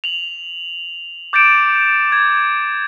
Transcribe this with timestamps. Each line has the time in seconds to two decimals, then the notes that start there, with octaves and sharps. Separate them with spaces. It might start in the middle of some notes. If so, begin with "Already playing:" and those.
0.04 F7 F#7
1.33 D6 G6 A6 C#7 D7 E7
2.12 G#6